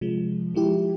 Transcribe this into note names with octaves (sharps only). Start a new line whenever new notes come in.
C3 F3 G#3
F3 G#3 E4 G4